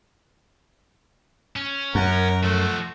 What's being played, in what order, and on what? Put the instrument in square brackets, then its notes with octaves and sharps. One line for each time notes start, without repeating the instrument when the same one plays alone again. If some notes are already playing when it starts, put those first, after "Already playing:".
[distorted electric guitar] C#4
[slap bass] F#2 [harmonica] A#4 F#5
[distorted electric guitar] F3 F#4 [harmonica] A3